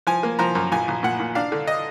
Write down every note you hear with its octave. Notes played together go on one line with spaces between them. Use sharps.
F3 G#5
A#3
F3 A#5
F#2
A#1 G#5
A#1
A#2 F#5
A#2
D4 F5
D3
D#5